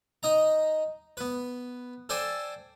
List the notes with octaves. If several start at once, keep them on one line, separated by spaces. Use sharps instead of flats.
D#4 D#5 A#5
B3 B4
A4 C5 D5 G5 G#5